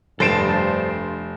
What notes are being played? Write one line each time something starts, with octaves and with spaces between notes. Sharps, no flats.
F1 G2 A4 C5 A5 D7 E7